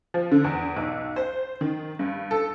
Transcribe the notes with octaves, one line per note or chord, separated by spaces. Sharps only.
F3
D3
E2
B1
C5
D#3
G2
A4